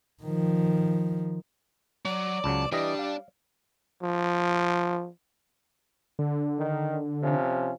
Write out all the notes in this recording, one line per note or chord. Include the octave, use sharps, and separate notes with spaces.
D#3 F3
F#3 D5
C#2 C#3 F#3 A5
E3 G3 D4 D5 D#5
F5
F3
D3
D#3
C3 F3 C#4